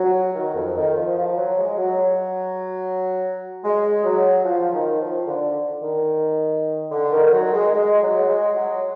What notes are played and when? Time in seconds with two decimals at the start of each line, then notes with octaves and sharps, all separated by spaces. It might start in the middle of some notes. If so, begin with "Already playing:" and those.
Already playing: F#3
0.34 D#3
0.54 F2
0.75 D#3
0.95 F3
1.16 F3
1.36 F#3
1.58 G#3
1.77 F#3
3.63 G#3
4.03 F#3
4.44 F3
4.72 D#3
4.99 F3
5.27 D3
5.81 D#3
6.91 D3
7.12 D#3
7.31 F#3
7.52 G#3
7.73 G#3
8.01 F#3
8.28 G#3
8.55 F#3